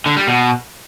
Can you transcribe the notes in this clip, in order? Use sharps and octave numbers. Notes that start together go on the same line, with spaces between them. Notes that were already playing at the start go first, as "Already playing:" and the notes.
D3
G3
B2